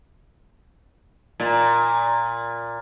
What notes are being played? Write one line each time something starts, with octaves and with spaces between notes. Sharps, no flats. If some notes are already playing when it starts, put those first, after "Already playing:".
A#2